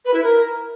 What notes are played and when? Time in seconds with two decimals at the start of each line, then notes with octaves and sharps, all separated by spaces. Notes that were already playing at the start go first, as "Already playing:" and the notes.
0.05 B4
0.14 E4
0.23 A#4